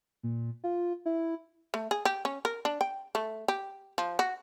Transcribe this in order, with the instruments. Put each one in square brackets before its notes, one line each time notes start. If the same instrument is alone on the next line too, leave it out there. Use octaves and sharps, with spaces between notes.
[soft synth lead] A#2
F4
E4
[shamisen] A3
G#4
G4
C#4
A#4
D4
G5
A3
G4
F3
F#4